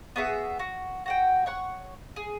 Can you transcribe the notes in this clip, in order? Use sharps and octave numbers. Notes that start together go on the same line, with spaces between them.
B3 F#4 G#4 E5
F#4
F#4 F#5 G5
C#5 F#5 C#6
G#4